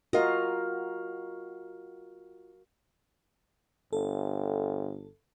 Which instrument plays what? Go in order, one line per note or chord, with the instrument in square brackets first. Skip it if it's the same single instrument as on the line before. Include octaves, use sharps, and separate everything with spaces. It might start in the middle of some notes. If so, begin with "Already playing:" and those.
[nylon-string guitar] F4 D#5 [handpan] F#4 A#4 F5
[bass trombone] G1 [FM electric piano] A4